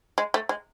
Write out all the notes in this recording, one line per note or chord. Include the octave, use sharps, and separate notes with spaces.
G#3
A3
G#3